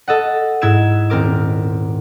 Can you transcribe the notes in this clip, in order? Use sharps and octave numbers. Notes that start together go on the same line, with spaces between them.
A4 D#5 F#5
G#2 E4 G#6 E7
D#1 C4 A#4 D6